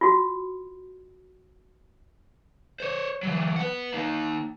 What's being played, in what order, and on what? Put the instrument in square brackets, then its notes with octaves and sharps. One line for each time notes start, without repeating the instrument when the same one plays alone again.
[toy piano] F4 F#4
[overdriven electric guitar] C5 C#5
E3 F#3
B4 F#5
A#3 D#4